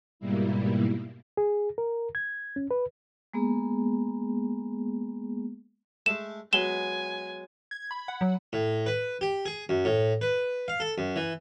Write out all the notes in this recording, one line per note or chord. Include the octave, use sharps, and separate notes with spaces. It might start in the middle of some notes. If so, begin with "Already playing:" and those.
G#2 B2 G3 A#3 E4
G#4
A#4
G#6
C#4
B4
G#3 A#3 B3 G#4
G#3 A3 E7
F#3 G#3 B3 G#5 E7 G7
G#6
B5
F#5
F#3
A2
B4
G4
G#4
F#2
A2
B4
F5
A4
F#2
E3